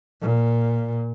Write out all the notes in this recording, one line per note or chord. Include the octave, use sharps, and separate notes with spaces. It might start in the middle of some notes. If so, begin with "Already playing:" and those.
A#2